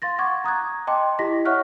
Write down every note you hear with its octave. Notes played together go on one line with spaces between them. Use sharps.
F5 C6 A6 A#6
F#5 C#6 D6 G#6
A#5 D#6 F#6 G#6
D#5 G5 A5 C6 D6
E4 G4 D#5 A#6 B6
C#5 E5 F#5 C#6 F6 F#6